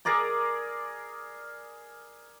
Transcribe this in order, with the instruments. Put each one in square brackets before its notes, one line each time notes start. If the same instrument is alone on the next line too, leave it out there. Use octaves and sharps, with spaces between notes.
[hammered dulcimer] G#4 A#4 D5 A#5